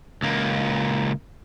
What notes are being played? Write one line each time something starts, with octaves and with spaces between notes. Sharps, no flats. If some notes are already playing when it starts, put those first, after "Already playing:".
C#2 A#3